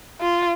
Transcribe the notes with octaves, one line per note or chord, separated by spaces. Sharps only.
F4